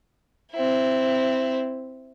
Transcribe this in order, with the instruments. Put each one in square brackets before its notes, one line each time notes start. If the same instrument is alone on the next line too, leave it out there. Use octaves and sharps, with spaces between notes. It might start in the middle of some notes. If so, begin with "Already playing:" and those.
[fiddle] C4 E4